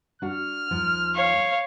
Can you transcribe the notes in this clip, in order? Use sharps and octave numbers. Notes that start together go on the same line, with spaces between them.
D4 F#4 F6
D#2 F3
C#5 F5